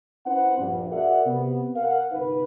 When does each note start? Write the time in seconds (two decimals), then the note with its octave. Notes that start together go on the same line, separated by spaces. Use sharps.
0.26 C4 C#4 E4 B4 C5 F#5
0.59 A#1 G2
0.92 F#4 G#4 A#4 D5 E5 F#5
1.26 C3 B3
1.76 A#4 F5 F#5
2.12 G1 C3 D#4 B4